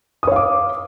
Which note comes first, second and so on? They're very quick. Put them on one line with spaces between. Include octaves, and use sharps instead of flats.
D#6 C#5 F5 D6